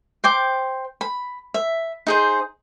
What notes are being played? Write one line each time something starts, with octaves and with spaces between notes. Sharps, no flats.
C5 G5 D6
B5
E5
D#4 G#4 C5